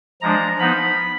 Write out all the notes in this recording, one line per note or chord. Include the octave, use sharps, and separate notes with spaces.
F3 G#3 D4 A#5
F3 B3 D#4 B5